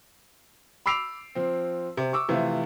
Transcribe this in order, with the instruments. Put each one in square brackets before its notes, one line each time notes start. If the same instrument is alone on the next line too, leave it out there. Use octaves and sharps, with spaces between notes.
[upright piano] B5 D6 E6 C7 D7 F7
F3 C4
C3
C#6 D6 E6
C3 E3 F3 A3 F4